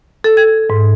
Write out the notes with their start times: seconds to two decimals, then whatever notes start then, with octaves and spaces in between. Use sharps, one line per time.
0.24 A4
0.37 G#6
0.70 G#2